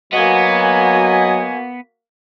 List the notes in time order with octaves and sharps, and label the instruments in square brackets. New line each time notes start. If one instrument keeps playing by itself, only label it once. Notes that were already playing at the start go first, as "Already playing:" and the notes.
[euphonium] F#3 [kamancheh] A#3 F#4 [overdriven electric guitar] B3 [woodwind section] D#5 G#5